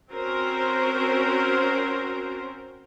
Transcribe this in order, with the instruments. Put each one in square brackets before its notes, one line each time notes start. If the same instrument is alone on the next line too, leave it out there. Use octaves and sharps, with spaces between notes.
[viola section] C4 C#4 F#4 A#4 C5